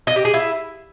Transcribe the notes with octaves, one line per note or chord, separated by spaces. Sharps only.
D#5
G4
G#4
E4